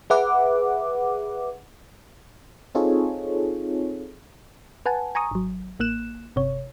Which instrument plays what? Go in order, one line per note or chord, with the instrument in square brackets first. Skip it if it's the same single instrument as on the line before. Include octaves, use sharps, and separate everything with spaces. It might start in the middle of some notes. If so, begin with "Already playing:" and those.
[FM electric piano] G#4 B4 E5 F#5 D6
C4 D#4 F4 G#4 A4 C#5
[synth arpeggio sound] B4 F#5 G#5 A5
G#5 A#5 C#6 D#6
G#1 F#3
A1 A#3 F#6 E7
G1 C3 C#5